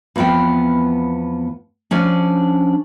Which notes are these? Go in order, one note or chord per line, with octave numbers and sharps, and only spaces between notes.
E2 F3 B3 C4 G5
F3 C#4 D4